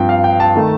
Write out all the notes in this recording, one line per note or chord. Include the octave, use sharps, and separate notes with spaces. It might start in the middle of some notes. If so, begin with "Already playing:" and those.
Already playing: G2 F3 C4 G5
F5
G5
A5
D#3 A3